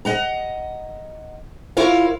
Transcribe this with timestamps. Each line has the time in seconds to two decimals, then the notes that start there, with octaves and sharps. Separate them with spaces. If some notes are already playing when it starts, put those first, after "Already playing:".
0.05 D#5 F#5 A#5
1.77 E4 F4 A#4 C#5 F5